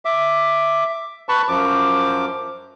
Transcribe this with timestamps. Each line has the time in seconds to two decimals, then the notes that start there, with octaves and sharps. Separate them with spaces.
0.05 E5 D6
1.29 B4 A5 B5 C#6
1.48 F#2 F3 D6